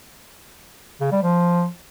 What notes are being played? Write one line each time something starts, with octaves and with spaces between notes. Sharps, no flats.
C#3
G3
F3